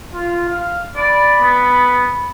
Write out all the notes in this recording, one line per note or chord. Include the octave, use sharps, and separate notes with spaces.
F4
F5
D5 B5
B3